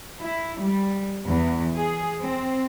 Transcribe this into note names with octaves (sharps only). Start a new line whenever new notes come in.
E4
G3
E2
G#4
C4